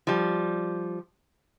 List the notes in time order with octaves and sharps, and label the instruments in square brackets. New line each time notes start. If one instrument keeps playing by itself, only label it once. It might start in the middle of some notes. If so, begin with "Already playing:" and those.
[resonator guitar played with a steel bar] F3 G3